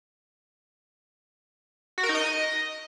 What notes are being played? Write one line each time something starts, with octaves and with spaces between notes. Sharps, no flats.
F#4
A#4
D#4
D#5